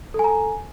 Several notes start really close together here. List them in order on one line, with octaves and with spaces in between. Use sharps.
A4 G#5 A#5